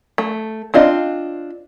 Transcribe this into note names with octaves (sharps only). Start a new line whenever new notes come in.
A3
C4 D4 F4 D#5